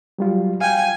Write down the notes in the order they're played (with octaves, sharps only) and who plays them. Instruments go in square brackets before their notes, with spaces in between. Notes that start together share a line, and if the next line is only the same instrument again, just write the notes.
[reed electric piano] F#3 G3 F4
[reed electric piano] F5 G5 [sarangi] G#5